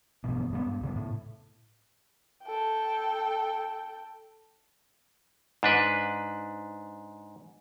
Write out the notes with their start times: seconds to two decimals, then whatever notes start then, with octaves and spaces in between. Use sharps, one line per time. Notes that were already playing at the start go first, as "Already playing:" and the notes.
0.24 A1 G2 B2
0.51 G1 G#3 B3
0.65 G2
0.81 D1 C#3 B3
0.96 A2
2.44 A4 G5
5.63 G#2 D4 B4